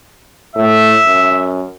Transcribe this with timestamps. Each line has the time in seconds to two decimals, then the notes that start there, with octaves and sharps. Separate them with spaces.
0.55 A2 E5
1.05 F#2